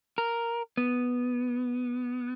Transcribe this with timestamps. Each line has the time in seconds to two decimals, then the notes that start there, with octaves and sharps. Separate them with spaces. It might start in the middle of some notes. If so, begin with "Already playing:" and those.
0.18 A#4
0.77 B3